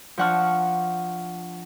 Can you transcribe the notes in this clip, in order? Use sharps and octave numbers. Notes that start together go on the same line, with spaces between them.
F3 D4 F#5 C#6 F6